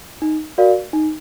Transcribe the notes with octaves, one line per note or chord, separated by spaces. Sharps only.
D#4
F#4 A#4 D5 F5
D#4